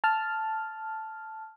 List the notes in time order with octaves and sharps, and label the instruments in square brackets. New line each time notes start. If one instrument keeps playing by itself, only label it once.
[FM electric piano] A5 F6